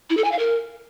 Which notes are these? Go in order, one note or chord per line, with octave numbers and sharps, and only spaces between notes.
E4
A4
G#5
F5
A#4